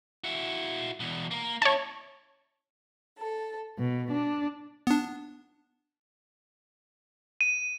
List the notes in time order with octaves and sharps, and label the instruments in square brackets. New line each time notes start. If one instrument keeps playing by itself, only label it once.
[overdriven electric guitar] E4 F#4
E2 B2
A#3 A#4
[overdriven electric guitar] C#4 E4 [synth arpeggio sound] C#5 A5
[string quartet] A4
B2
D4
[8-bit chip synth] B3 D4
[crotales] D#7